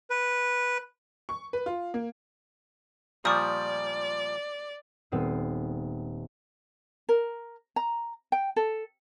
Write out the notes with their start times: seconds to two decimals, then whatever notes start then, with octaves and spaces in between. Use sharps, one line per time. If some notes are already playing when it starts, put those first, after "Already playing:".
0.10 B4
1.29 C#6
1.53 B4
1.66 F4
1.94 A#3
3.25 A#2 F3 G3 D5 C#6 D#6
5.12 D#1 B3 C4 D#6 C7
7.09 A#4
7.76 A#5
8.32 G5
8.56 A4